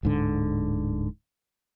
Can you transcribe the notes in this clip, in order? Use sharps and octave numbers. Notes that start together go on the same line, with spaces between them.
D1 G#2 D3